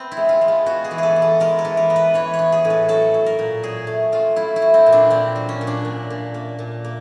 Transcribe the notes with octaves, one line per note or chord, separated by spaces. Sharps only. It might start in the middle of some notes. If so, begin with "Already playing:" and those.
Already playing: B3 C4
E4
G#3
F4
G#3
F4
B3 F#4
G#4
E3
G#4 A4
B3
A4
G#3 A#4
A4
E3
A#4
B3
B4
E3 C#5
C#5
B3
G#4
A2
A4
F#3 A4
F#3
A#4
A#2
F#3 G#4
A3
F#3 F4
F#3 E4
E4
F#3
C4
A#2
D4
A#2 C4
F#3
C#4
A#2
D4
A#2
A#2
A#3
A#2
A#3